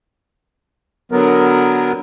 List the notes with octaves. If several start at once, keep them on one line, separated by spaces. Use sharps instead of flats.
D3 F#3 B3 A#4